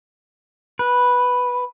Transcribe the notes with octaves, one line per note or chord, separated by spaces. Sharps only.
B4